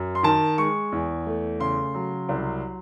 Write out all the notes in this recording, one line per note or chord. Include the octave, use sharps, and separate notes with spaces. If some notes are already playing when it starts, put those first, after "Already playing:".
Already playing: F#2
C6
D#3 A5
G#3 C#6
E2
A3
C#3 C6
F#3
C2